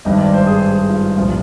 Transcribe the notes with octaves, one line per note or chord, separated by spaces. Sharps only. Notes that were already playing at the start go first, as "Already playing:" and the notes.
G#1 G2 D#3 D#5
D5
C5
G#4
G#4
G#4
F4
F4
C2 A#2 F3 F4